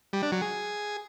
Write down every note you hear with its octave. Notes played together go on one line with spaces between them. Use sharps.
G3
D4
F#3
G#4